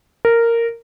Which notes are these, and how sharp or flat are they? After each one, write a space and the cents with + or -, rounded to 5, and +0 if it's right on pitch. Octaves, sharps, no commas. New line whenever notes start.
A#4 -10